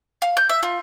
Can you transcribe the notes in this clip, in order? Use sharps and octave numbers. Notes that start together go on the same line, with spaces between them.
F5
G6
E5
F4